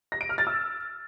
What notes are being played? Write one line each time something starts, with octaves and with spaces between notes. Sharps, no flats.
A#6
D7
F6
A6
E6